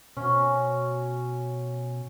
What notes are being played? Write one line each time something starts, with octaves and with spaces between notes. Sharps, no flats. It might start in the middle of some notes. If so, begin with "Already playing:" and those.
B2 C#4 F#4